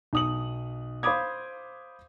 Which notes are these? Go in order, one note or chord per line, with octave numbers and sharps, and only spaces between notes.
B1 D#6 F#7
C5 F5 B5 D6 D#6 G#6